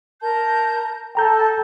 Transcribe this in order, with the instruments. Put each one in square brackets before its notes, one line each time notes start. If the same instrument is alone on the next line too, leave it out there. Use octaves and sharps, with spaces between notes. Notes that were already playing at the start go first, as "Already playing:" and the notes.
[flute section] A#4 A5 G6
[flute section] A4 A5 [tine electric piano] G5 A#5 G6